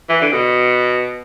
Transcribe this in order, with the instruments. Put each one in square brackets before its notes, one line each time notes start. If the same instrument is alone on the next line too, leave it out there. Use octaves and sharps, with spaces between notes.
[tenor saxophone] E3
D3
B2